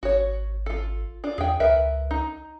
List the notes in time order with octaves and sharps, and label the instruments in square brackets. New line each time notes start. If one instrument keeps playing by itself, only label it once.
[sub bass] G#1 [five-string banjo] F#4 C#5
[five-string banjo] F4 A4
D4 F4
[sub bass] E2 [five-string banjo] G#4 G5
[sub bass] C#2 [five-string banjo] A#4 B4 E5
[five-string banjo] D#4